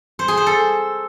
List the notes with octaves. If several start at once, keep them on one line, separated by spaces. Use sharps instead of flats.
C5
G#4
C5
A4